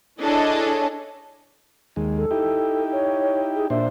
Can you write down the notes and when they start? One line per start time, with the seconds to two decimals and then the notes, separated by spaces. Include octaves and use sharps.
0.22 D4 E4 G#4 A4 C#5 D#5
1.96 D#2 G#3
2.18 A4
2.31 D#4 E4 G4
2.92 C#5
3.56 G#4
3.70 A#2 D4 C5 E5